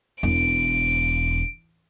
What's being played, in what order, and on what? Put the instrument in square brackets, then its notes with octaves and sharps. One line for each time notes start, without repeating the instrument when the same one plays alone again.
[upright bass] E1 [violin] D7